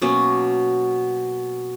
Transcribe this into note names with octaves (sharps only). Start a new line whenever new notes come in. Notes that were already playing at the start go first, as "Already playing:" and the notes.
B2 F#3 A#3 C#4